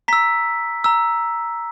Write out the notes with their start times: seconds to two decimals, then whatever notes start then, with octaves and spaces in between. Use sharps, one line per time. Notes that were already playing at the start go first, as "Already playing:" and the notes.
0.08 A#5 E6 B6
0.84 A#5 E6